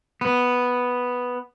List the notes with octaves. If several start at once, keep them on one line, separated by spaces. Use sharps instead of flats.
B3